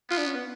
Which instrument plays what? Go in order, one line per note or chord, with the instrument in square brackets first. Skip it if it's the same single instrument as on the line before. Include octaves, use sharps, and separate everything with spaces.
[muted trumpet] B3 [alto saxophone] F4
[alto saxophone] D4
C#4
B3